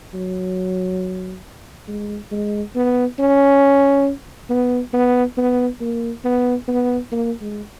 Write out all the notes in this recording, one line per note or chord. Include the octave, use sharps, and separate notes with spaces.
F#3
G#3
G#3
B3
C#4
B3
B3
B3
A#3
B3
B3
A#3
G#3